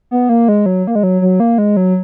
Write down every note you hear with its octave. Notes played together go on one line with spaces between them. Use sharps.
B3
A#3
G#3
F#3
A#3
G#3
F#3
F#3
A#3
G#3
F#3